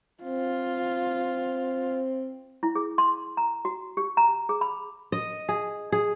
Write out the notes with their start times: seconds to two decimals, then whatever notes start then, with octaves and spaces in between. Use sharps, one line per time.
0.23 C4 F4
2.63 E4
2.75 G#4
2.98 C6
3.37 A#5
3.65 F#4
3.97 G4
4.17 A#5
4.49 G#4
4.61 B5
5.12 D#5
5.49 G#4
5.92 G#4